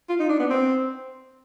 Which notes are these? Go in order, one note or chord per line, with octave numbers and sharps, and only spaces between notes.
F4
D#4
D4
B3
C4